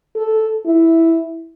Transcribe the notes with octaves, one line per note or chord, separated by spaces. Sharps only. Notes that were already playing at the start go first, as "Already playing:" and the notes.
A4
E4